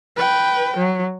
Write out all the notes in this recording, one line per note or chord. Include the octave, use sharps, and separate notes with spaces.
B4 G5
F#3